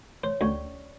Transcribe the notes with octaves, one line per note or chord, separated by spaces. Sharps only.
C5 C#5
D2 C#4 D5 C#6